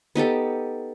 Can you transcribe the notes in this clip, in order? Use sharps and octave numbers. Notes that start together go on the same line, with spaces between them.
B3 D#4 G4 A4